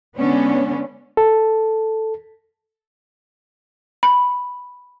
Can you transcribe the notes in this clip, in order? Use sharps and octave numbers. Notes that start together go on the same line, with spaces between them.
D3 G#3 B3 C#4 D4
A4
B5